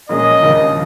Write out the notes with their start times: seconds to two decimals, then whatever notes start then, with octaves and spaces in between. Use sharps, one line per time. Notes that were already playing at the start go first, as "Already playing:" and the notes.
0.09 A#2 F3 G#3 C#4 G#4 D#5
0.42 D#2 C#3 F3 A#3 D#4